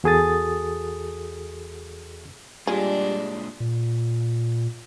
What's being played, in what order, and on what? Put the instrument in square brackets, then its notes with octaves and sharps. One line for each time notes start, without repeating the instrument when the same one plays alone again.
[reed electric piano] E2 F#4 G#4 A4 D#6 A6
[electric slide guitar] A#2 G#3 [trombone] G3 [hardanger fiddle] D4 [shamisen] F4 G#4
[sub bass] A#2